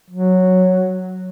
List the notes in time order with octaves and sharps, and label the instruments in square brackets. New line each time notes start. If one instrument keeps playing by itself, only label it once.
[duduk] F#3